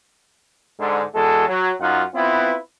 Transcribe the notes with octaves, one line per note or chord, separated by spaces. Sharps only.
G#2 D3
E2 G#3 F#4 A4
F#3
F#2 D#4 F4 F#5
B3 C4 E4 F4 B4